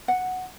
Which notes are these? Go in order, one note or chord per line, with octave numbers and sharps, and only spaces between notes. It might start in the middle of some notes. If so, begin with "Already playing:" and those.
F#5